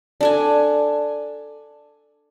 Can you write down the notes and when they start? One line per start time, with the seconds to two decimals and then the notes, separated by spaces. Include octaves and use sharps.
0.21 D4 A4 G#5